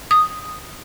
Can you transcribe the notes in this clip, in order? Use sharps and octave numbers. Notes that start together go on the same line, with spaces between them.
D#6